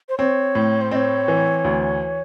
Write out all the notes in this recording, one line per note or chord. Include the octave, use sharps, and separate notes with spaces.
C5
C4 C#5
A2
C5
C4 C#5 D#5
E3
D2